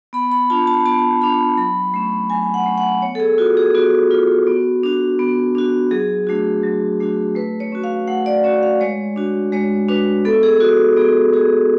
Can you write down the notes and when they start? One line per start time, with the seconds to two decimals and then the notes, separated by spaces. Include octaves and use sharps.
0.13 B3 B5
0.31 B5
0.50 D4 F4 A5
0.67 A5
0.85 B3 A5
1.21 D4 F4 B5
1.57 F#3 B5
1.94 A3 C#4
2.30 F#3 G#5
2.54 F#5
2.66 A3 C#4
2.78 F#5
3.02 B3 C#5
3.15 A4
3.20 G#4
3.38 F4 F#4
3.57 G#4
3.75 B3 F#4
4.11 F4
4.47 B3
4.83 D4 F#4
5.19 B3
5.55 D4 F#4
5.91 F#3 G#4
6.27 A3 D4 F#4
6.63 F#3
7.00 A3 D4 F#4
7.35 A3 B4
7.60 C#5
7.72 C#4 F#4
7.84 F5
8.08 A3 F#5
8.26 D5
8.44 C#4 F#4 C#5
8.63 F5
8.81 G#3 C#5
9.16 D4 F#4
9.52 G#3 C#5
9.88 D4 F#4 B4
10.25 B3 A4
10.43 G#4
10.61 F#4
10.96 B3 G#4
11.33 F#4 G#4